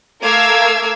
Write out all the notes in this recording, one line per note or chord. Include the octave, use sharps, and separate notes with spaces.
A3 A#4 F5 D6 E6 G#6